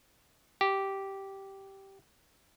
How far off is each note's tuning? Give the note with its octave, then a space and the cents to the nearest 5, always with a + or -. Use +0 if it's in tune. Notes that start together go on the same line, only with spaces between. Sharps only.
G4 -10